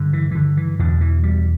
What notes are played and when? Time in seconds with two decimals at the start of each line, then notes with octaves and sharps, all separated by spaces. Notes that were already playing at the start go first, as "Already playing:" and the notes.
Already playing: G2 D3
0.13 E3
0.31 E3
0.35 D3
0.57 E3
0.79 E2 B2 D3
1.01 E3
1.23 G3